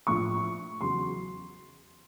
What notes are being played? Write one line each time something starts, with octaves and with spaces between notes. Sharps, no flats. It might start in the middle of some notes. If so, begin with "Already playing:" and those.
A#1 A2 F3 C#6
E2 C#3 F#3 C6